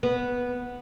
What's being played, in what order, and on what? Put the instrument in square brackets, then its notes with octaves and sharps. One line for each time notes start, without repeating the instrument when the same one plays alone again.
[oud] B3